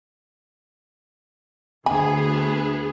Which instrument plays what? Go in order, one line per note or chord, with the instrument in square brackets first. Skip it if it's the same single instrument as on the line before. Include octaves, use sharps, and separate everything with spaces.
[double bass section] D2 [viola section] B3 G#4 [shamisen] G#5 B5